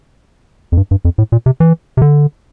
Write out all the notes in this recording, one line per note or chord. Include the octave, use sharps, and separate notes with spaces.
F2
G2
G2
F2
A2
A#2
C3
E3
C3
D3